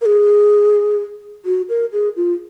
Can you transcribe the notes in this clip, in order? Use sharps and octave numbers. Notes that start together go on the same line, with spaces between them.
A#4
G#4
F#4
A#4
G#4
F4